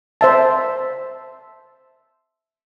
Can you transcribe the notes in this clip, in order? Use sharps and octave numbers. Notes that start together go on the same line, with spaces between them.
C5 E5 A5